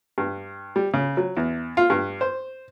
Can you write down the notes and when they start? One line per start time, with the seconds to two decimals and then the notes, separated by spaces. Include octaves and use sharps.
0.18 G2
0.76 G3
0.94 C#3
1.17 F#3
1.37 E2
1.77 F4
1.90 G2
2.21 C5